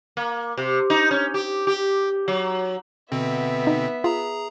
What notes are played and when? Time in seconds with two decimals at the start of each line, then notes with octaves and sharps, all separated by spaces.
0.17 A#3
0.57 C3
0.90 D#4
1.11 C#4
1.34 G4
1.67 G4
2.28 F#3
3.12 B2 D3 B3 C4 E5
3.67 D#4
4.04 F4 G#4 A#5